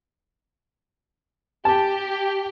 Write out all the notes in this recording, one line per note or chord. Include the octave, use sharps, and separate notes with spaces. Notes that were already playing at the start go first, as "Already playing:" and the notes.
G4 A5